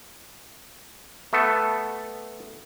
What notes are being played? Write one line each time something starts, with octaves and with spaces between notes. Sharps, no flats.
A3 B3 A4